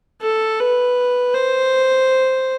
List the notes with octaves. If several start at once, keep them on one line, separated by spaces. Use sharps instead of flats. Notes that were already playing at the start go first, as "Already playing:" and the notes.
A4
B4
C5